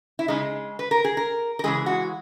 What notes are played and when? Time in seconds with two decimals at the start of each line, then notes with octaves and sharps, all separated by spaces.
0.19 E4
0.28 C#3 G#3 D#4
0.79 B4
0.91 A#4
1.05 G#4
1.17 A#4
1.59 A#4
1.64 C#3 E3 G#3 G#4
1.86 F#4